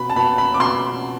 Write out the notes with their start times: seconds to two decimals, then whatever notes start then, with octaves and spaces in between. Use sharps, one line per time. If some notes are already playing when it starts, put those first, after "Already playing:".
Already playing: B2 B5
0.09 A5
0.16 B2 B5
0.38 B5
0.54 D6
0.60 B2 C6